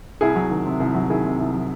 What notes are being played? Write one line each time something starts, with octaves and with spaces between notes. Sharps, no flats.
C2 E4 G#4
F#3
D#3
C3
C2
F#3
D#3 E4 G#4
C3
C2
F#3